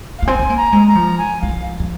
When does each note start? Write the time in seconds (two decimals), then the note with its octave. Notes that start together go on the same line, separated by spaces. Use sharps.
0.19 F5
0.22 A#3
0.27 C4 G#5
0.39 C4
0.50 A#3
0.57 A#5
0.73 G#3
0.88 A#5
0.95 F3
1.18 G#5
1.41 G#3 F5
1.49 F3
1.80 F3